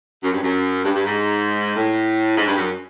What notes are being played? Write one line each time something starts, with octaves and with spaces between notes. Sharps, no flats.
F#2
G2
F#2
G2
G2
G#2
A2
G#2
G2
F#2